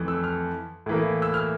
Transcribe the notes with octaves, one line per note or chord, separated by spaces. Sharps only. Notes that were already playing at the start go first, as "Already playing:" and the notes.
Already playing: F2 E3 A3
E6
F6
A2 E3 A#3
E6
F6